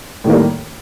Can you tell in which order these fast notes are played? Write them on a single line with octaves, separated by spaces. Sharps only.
A2 D#3 A#3 G3